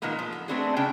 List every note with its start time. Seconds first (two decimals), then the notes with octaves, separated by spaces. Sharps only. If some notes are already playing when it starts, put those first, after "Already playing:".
0.02 A#2 D#3 F3 G#3 A#3 B3
0.19 F3
0.33 A4
0.48 A3 B3 C4 D4 F#4 G#4
0.76 C#3 C4 D4 G#4 G5